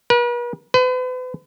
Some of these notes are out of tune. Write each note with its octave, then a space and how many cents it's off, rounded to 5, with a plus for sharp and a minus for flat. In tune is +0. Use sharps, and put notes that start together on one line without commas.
B4 -45
B4 +40